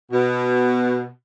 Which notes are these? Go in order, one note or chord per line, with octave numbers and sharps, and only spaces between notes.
B2